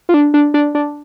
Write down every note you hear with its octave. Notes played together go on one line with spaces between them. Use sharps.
F4
D4
D4
D4
D4